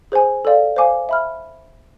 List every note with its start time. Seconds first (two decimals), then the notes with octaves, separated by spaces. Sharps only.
0.12 G#4 C5 G#5
0.45 A4 D5 F5
0.76 C5 F5 G#5 D6
1.09 E5 B5 F6